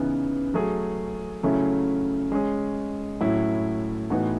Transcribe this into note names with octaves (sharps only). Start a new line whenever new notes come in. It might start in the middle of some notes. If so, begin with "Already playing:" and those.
Already playing: C#3 E3 B3 D#4
F#3 A3 C#4 G#4
C#3 F#3 A3 C#4 E4
G#3 C#4 G#4
A2 F#3 C#4 E4
A2 E3 B3 D#4 F#4